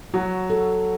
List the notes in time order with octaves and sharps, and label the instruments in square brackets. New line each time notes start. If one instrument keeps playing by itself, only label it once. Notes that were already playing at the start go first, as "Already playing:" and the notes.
[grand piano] F#3 [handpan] F#4
[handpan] A4